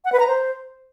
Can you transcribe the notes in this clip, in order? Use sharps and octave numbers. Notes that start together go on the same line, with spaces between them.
F#5
B4
A#5
C5